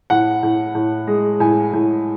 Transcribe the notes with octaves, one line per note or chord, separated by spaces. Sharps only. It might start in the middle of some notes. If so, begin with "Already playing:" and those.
A2 F#5
A2
A2
G#3
A2 G#5
A2